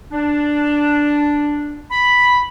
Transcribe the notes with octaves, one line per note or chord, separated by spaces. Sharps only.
D4
B5